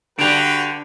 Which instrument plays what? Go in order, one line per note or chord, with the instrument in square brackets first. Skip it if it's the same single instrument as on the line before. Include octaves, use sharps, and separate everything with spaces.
[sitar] D3 [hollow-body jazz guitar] D4 G4 [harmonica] F#4 B4 G5 [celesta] D7 F7